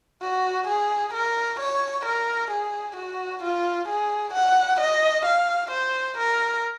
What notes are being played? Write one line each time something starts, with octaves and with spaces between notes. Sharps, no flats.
F#4
G#4
A#4
C#5
A#4
G#4
F#4
F4
G#4
F#5
D#5
F5
C5
A#4